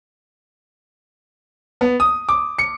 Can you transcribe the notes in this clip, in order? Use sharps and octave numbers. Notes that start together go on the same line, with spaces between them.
B3
D#6
D6
C#7